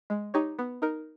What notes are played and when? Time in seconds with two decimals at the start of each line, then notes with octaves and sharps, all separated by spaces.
0.10 G#3
0.34 D#4 G4 C#5
0.59 B3
0.82 D#4 A#4